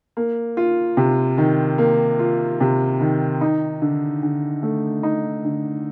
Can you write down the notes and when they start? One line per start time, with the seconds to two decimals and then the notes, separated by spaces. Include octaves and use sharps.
0.17 A#3
0.57 F4
0.97 C3
1.38 D#3
1.78 A#3
2.19 F4
2.60 C3
3.01 D#3
3.41 D#4
3.82 D3
4.23 D3
4.63 A3
5.03 D#4
5.45 D3